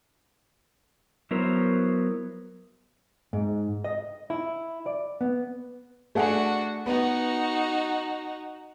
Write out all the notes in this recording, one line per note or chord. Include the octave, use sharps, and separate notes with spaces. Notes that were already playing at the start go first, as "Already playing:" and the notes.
F#3 B3 E4 A#4 C5 C#5
G#2
D#5
E4
D5
B3
A3 D4 F#4 G#4 F#5
B3 D#4 F#4